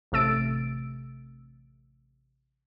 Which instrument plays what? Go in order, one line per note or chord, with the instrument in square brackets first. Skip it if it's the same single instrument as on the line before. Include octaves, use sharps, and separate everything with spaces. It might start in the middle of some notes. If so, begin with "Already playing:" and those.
[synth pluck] A1 C3 A3 E6 A6 D7